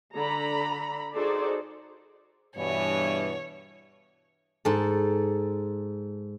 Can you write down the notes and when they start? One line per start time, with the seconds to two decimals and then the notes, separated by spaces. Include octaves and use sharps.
0.14 D3 A#5 B5
1.14 D#4 F#4 G#4 A4 C5 D5
2.57 G2 B2 E3 C#5
4.65 G#2 A4